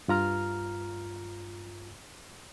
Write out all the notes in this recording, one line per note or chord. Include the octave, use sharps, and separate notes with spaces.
G2 F4 A#5 F6